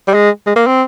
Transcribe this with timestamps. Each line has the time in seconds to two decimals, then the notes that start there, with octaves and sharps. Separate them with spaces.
0.08 G3
0.14 G#3
0.47 G#3
0.56 A#3
0.67 C4